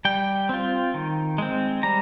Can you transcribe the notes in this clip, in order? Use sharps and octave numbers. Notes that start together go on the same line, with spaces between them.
G3 G5
C4 F4
D#3
G#3 C4
G3 A#5